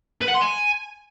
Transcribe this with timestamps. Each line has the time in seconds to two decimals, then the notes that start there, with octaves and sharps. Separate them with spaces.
0.22 B4
0.28 F#5
0.35 C6
0.42 G#5